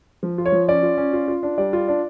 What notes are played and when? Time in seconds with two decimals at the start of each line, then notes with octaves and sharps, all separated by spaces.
0.23 F3
0.38 F4
0.46 C#5
0.52 F3
0.69 C#4 D5
0.83 F4
0.98 C#4
1.13 F4
1.28 F4
1.43 D4
1.58 G3 D5
1.73 F4
1.88 D4